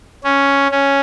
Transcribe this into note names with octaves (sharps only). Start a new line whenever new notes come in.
C#4
C#4